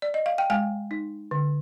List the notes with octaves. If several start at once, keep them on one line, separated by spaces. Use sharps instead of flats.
D5
D#5
F5
G5
G#3 F5 G#5
D#4
D3